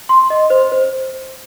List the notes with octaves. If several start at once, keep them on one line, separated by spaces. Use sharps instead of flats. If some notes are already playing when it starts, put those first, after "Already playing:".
C6
D#5
C5
C5